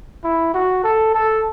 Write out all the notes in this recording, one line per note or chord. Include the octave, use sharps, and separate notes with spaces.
E4
F#4
A4
A4